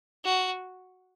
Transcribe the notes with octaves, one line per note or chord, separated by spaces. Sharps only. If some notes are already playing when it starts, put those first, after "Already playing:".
F#4